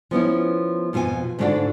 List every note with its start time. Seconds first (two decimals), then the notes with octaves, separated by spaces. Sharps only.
0.11 F3 B3 C#4 E4
0.93 F2 B2 F4 F#4 G#5
1.39 G#2 D3 A3 D4 F4 F#4